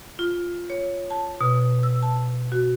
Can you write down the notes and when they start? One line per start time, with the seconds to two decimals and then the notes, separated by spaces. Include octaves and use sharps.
0.19 F4
0.70 C#5
1.10 A5
1.41 B2
1.83 E6
2.03 A5
2.52 F#4